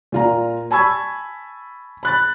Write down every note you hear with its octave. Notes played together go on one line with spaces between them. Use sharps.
A#2 F4 A#5
G#5 A5 B5 C#6 E6 G#6
B5 F#6 A6